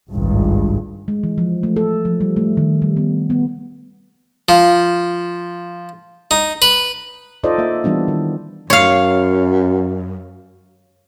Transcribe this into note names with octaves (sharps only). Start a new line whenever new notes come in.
G#1 C#2 G2
G#3
E3
F3
A3
A4
F3
G3
A3
D#3
G3
B3
B3
F3
D#4
B4
D#4 F4 A4 C5 D5 D#5
A#3 E5
E3 G3 B3 D4
D#3
F#2 C#5 F5